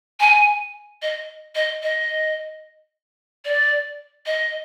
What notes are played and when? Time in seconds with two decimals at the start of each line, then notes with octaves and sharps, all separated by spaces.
0.20 G#5
1.02 D#5
1.55 D#5
1.82 D#5
3.45 D5
4.26 D#5